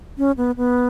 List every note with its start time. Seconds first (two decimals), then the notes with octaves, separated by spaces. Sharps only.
0.18 C#4
0.37 B3
0.57 B3